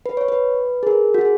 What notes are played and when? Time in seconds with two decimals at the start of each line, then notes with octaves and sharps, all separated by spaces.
0.06 B4
0.17 C#5
0.28 B4
0.83 G#4
0.87 A#4
1.14 F#4
1.21 G#4